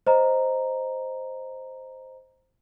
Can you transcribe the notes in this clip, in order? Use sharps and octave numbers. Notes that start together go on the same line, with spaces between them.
C5 D#5 A#5